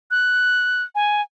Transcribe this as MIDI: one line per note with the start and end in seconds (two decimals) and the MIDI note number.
0.11 0.82 90
0.95 1.22 80